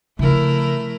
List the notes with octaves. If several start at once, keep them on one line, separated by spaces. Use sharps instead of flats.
C#3 F3 A3 E4 A#4